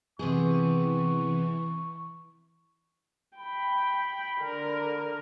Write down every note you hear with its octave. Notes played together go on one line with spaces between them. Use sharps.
C3 E3 B3 G#4 C#6
G5 B5
D3 A#4